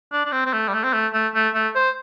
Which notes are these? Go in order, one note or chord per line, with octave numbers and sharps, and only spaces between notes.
D4
D4
C4
C4
A3
G3
A3
C4
A3
A3
A3
A3
C5